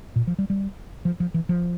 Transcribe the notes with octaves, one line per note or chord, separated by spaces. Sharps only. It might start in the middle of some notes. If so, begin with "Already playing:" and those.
A#2
F3
G3
G3
F3
F3
E3
F3